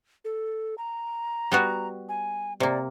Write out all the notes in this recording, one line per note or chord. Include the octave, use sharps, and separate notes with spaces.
A4
A#5
G3 B3 F#4
G#5
C3 A#3 D5